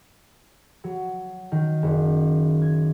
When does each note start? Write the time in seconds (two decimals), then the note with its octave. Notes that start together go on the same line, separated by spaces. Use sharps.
0.84 F#3
1.52 D#3
1.83 F#1
2.62 G#6